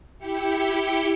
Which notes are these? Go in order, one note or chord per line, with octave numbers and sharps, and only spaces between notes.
E4 G4 G5 C#7